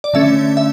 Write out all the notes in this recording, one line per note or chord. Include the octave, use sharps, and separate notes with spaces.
D5
D3 A3 C#4 E5
E5